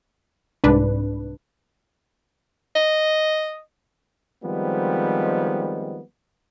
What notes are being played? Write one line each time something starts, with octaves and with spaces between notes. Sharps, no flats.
C2 G#2 D4 B4
D#5
D#3 F3 G3 G#3 B3 C4